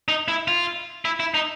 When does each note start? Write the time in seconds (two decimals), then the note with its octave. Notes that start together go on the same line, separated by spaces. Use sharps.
0.08 D#4
0.28 E4
0.48 F4
1.05 E4
1.20 E4
1.34 D#4